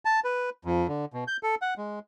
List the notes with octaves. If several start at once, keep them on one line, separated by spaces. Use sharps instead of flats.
A5
B4
F2
D3
B2
G6
A4
F#5
G#3